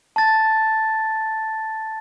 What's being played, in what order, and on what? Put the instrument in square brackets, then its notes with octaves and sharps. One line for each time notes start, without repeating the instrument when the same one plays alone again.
[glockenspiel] A5 A6